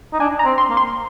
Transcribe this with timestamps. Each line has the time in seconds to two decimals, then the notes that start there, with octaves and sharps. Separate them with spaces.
0.13 D#4
0.20 D4 G#5
0.39 A#5
0.45 C4
0.58 C6
0.70 A#3
0.77 C6